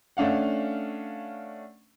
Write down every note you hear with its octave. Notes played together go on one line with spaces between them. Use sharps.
A3 C#4 D4 F5 F#5